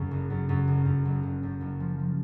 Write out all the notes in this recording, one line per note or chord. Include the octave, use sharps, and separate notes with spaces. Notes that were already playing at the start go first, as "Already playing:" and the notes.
Already playing: F#2 C#3
F#1
F#2
F#2
F#1
F#2
F#1
F#1
F#2
F#1
F3
F3